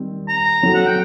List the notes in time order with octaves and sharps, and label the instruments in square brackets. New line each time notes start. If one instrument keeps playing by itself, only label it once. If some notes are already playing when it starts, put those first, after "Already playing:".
Already playing: [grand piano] D#3 G3 C4
[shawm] A#5
[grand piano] F#3 C4 F#4 A4
[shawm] F#5
G5